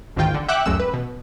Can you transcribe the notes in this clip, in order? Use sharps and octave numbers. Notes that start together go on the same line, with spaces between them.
A1 D2 G#2 D#3 F4 G5
D3
E5 F#5 G5 D6 F#6
C#2 F#2 G#3 A3 E6
B4
B2